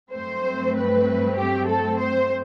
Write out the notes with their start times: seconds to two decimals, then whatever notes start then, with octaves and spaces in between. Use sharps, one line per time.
0.11 G2 F#3 A3 C4 C5
0.74 B4
1.36 G4
1.67 A4
1.99 C5